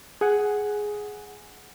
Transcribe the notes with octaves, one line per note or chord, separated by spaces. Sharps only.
G#4 F#5